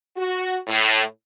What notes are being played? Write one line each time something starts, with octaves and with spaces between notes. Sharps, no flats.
F#4
A2